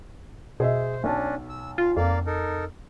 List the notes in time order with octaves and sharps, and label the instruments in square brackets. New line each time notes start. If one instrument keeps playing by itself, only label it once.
[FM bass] B2 [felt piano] G#4 D#5 E5 [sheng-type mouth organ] C5
[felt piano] B1 A5 [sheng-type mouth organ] C#4 D4
[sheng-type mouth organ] E6
[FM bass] F4 [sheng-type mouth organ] F5
[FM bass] F2 [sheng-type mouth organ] A#3 D5 F5
[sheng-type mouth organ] D#4 A4 A#4